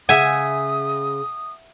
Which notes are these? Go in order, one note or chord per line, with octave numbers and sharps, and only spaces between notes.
C#3 E5 F#5 G#5 D#6